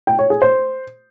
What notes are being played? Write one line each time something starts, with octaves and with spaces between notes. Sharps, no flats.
G5
C#5
G#4
C5